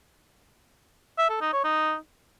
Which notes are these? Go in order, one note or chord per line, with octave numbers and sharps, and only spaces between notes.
E5
A4
D#4
C#5
D#4